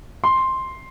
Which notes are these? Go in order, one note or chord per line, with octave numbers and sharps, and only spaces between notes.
C6